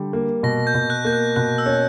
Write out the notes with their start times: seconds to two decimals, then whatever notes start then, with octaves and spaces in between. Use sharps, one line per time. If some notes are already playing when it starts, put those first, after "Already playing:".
Already playing: D3 G3
0.13 A#3
0.43 B2 A#6
0.67 G6
0.74 B2
0.90 F#6
1.05 A#3 G6
1.13 F#6
1.36 B2 F#6
1.58 E6
1.66 C#4